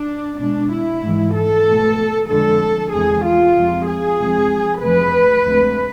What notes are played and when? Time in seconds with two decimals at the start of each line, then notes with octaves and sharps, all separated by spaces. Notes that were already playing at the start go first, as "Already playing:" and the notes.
Already playing: D4
0.40 B2 G#3 D4
0.72 E4
1.03 G#2 E3 G#3
1.35 A4
1.67 B2 A3
2.29 F2 D3 F3 G#3 A4
2.92 E2 C3 G#3 G#4
3.25 F4
3.55 F2 C3 G#3
3.87 G#4
4.19 F2 C3 G#3
4.82 F2 C3 E3 A3 B4
5.45 D2 C3 G#3